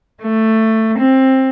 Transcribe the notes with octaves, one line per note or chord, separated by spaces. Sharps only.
A3
C4